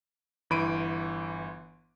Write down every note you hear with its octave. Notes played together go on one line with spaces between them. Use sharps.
G1 E3 B5 C6 D7 D#7